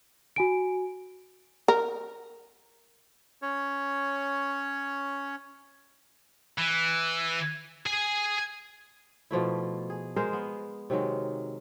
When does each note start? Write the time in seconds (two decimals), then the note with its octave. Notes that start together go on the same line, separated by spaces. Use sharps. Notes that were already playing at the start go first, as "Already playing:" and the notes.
0.36 F#4 G#5 D7
1.68 A#4
3.42 C#4 C#5
6.58 E3
7.86 G#4 G#5
9.31 B2 F3 A3 E4
9.90 G#4
10.16 G#3 G#4 A#4 C5
10.33 B3
10.90 C3 D#3 F#3 G#3